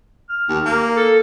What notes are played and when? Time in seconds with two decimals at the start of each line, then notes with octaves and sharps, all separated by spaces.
0.29 F6
0.49 D#2
0.66 A#3
0.97 A4